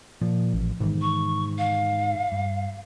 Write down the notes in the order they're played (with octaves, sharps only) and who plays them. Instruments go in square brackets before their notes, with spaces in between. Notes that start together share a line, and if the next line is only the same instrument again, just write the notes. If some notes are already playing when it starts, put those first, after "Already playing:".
[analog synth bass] A#2 [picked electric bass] F3
[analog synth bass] A1
[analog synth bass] G#2 [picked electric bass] B2 D#3 E3
[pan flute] C#6
F5
[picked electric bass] G2